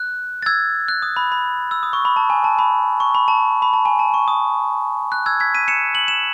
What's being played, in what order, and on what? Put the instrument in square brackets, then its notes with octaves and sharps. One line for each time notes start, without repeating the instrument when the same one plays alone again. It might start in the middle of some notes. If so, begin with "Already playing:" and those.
Already playing: [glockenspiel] F#6
A6
E6 G#6
F#6
D#6
B5
B5
E6
D#6
C#6
B5
A5
G#5
A5
B5
C#6
B5
A5
B5
A5
G#5
A5
C#6
D#6
F#6
E6 G#6
G#6 B6
B6 D#7
C#7 E7
F#7
E7